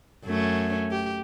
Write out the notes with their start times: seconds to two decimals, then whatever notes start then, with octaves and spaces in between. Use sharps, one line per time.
0.25 F#2 A3 C#4
0.91 G4